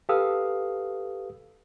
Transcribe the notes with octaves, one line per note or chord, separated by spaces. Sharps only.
G4 A4 B4 F5 D#6 E6